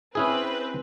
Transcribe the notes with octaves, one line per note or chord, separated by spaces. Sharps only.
C4 C#4 E4 G#4 B4